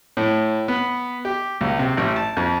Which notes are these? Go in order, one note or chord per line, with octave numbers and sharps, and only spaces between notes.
A2
B3
G4
C#2
C3
A1
A5
F2